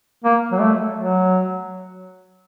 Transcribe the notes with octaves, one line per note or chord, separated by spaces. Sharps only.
A#3
F#3
A3
F#3